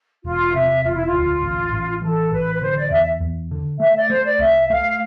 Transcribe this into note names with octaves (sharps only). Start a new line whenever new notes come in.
E1 F4
C3 E5
E1 F4
E4
F4
D2
A1
A1
E3 A4
A1 B4
B4
D3 C5
D5
E2 E5
E2
D3
A3 E5
D5
A3 C5
D5
C2 E5
A3 F5